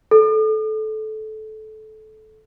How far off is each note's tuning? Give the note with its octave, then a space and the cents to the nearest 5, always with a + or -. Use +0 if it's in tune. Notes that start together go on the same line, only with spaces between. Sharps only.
A4 -20